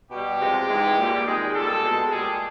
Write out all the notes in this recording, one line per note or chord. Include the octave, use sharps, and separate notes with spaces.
B2 G3 G4
C3 F3 G#3
G#2 E3 G#3
A#2 G3
C3 D#3 G#3 G#4
A#2 G3 A4
B2 G#3
A#2 G3 G#4